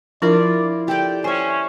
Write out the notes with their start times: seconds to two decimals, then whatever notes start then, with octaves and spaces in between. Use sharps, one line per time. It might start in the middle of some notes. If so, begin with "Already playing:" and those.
0.22 F3 D4 E4 F4 A#4 D5
0.88 G4 A4 D5 G5
1.24 C#4 C5 E5 G#5